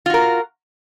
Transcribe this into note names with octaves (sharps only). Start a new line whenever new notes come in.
F4 F#4 A#4